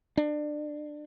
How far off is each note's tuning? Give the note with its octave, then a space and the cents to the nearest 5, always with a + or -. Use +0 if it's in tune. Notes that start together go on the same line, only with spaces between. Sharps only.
D4 +25